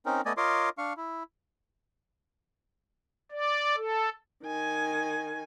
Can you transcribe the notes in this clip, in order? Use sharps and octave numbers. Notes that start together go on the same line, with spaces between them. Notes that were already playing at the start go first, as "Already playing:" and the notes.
C4 C#4 D#4 A#4
A3 B3 D5 D#5 G#5
F4 A#4 C#5 D#5 C6 D6
D4 F5 C#6
E4
D5
A4
D#3 G#5